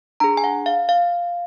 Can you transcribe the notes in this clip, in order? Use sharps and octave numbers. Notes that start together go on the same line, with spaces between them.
D4 G#4 A#5
G#5
F#5
F5
F5